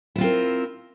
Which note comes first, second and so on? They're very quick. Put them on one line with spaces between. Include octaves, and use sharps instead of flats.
E4 F4 C4 A#4